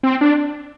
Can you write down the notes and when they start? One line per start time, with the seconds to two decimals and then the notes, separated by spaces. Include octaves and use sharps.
0.03 C4
0.21 D4